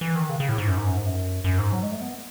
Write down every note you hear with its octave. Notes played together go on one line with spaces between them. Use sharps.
E3
D#3
C#3
C#3
A2
G#2
F#2
G#2
F#2
G#2
F#2
F#2
G#2
F#3
G#3
A3
B3